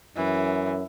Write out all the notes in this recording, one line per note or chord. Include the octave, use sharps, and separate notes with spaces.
F#2 E3